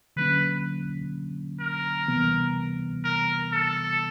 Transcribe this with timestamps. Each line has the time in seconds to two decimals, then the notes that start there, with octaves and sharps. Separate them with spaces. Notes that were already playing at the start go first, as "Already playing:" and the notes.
0.17 D3 F#3 A#3 C#4 B4
1.60 A#4
2.08 C3 E3 G3 B3
3.04 A#4
3.53 A4